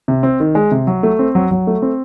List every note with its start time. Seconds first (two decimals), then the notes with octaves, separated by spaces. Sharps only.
0.08 C3
0.23 C4
0.40 D#3
0.55 G#3
0.71 C3
0.87 F#3
1.03 A3
1.19 C4
1.35 F#3
1.51 F#3
1.67 A3
1.82 C4